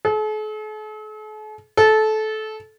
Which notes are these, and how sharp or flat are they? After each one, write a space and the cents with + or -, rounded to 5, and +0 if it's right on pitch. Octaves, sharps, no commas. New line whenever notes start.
A4 -45
A4 -20